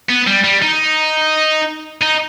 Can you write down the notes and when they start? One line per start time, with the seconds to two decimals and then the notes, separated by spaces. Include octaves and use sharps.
0.09 B3
0.27 G3
0.44 G3
0.62 D#4
2.02 D#4